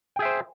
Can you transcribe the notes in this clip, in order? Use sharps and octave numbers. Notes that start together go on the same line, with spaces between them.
G#4 C5 E5 G5